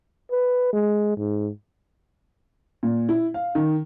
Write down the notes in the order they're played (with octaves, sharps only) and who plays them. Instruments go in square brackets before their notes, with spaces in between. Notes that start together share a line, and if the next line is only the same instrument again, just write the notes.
[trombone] B4
G#3
G#2
[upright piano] A#2
E4
F5
D#3